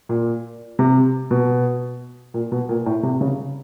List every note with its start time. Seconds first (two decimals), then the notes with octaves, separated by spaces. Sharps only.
0.09 A#2
0.79 C3
1.31 B2
2.34 A#2
2.52 B2
2.69 A#2
2.86 A2
3.03 C3
3.21 C#3